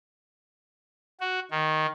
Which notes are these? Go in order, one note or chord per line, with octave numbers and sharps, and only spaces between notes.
F#4
D#3